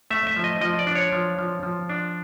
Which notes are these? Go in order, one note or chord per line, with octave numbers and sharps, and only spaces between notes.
A3 E5
E5
F3
D#5
F3 D#5
D5
D4
C#5
F3
F3
F3
D4